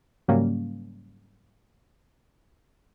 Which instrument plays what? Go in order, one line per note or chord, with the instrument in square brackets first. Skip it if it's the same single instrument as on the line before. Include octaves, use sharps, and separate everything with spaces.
[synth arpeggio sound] G#2 C#3 F#3 G3 A#3 C#4